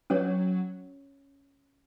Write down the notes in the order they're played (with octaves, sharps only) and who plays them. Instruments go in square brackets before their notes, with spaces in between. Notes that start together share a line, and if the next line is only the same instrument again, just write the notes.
[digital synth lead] F#3 [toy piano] C#4 C#5